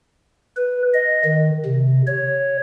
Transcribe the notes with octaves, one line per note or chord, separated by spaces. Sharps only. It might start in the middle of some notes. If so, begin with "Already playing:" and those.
B4
D#5
D#3
C3
C#5